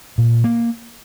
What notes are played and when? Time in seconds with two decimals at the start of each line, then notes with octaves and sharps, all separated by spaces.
0.18 A#2
0.44 A#3